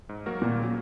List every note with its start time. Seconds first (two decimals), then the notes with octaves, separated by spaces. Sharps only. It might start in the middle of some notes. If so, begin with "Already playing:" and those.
0.09 G#2
0.26 F#3 A#3 F#4 A#4
0.42 D#2 A#2
0.59 C#3 F#3